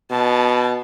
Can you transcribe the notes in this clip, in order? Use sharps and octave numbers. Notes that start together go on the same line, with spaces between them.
B2 A5